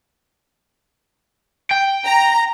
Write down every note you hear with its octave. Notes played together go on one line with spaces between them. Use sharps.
G5
A#5